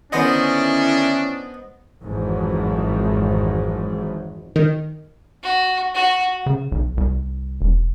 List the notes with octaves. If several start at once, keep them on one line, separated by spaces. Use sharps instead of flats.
D3 D#3 B3 C#4 D4 E4 C5 D#5
G#1 F2 G#2 D#3 E3 F#3
D#3
F#4
F#4
C#3
B1
C2
E1